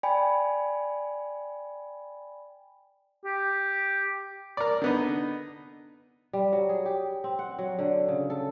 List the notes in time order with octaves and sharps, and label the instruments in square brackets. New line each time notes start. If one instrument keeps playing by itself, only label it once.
[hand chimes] D5 G5 G#5 B5
[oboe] G4
[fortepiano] A#4 D5
D3 B3 D#4
[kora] G3
F#3
G#4
G4
C4
F#5
F#3
D3
C#3
A4